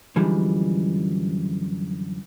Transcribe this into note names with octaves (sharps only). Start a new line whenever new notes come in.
F#2 D3 E3 F3 G3 G#3